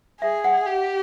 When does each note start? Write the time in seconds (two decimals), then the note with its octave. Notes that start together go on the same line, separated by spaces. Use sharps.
0.21 G#4 E5
0.44 F#5
0.66 G4